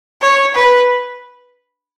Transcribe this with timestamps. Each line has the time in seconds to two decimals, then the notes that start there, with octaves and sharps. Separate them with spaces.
0.22 C#5
0.55 B4